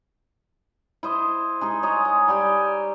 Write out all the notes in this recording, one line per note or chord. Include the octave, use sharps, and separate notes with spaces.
E4 C5 D#5
G#3 D#4 G#4
C#5 D#5 A#5
D#5
G3 G4 G5 G#5